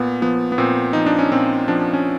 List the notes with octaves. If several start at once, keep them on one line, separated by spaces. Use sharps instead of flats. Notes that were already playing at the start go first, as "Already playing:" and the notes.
Already playing: A#2 B3
F3 B3
B3
A#2 C4
F3 D#4
D4
C#4
A#2 C4
F3 D4
C#4